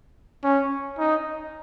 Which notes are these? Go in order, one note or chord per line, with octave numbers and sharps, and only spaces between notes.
C#4
D#4